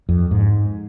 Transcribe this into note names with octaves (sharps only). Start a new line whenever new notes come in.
F2
G#2